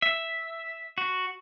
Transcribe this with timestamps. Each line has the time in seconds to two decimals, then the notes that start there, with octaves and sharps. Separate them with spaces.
0.02 E5
0.98 F#4